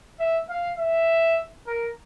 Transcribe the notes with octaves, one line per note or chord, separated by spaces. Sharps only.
E5
F5
E5
A#4